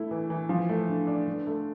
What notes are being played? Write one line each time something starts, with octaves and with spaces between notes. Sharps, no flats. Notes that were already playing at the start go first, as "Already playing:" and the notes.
Already playing: A3 E4
E3
E3
F3
A3
D3
D4
D3
A3